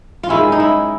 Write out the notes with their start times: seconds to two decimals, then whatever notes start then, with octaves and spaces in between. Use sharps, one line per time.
0.23 F4
0.29 D#3 G#3 C#4 E4
0.52 D#4
0.60 E4